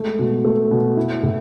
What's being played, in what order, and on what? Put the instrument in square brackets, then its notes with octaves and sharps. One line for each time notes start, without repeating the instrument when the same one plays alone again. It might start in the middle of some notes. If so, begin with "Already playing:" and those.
Already playing: [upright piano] G#3 A3
B2
A3
B2
E4
A2